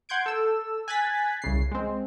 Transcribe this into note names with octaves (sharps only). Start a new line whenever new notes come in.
F#5 C6 G6 G#6 D7
A4 E6
G#5 F#6 G#6 A6 B6
C2 C#3 C7
G#3 C4